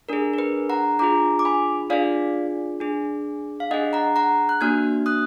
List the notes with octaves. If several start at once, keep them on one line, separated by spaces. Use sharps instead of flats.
D4 G#4 A#4
A#4
B4
F#5 A#5
D4 F4 G#4 A#5 D6
D6
G#5 B5
D4 F4 G#4 D5 F5
D4 G#4
F5
D4 G#4 D#5 F#5
F#5 A#5
F#5 A#5
F#6
A#3 D4 F#4 F6 G#6
D#6 F#6